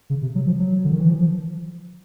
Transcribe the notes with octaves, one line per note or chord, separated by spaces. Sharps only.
C#3
C3
F#3
F3
F#3
D3
D#3
E3
F3
F3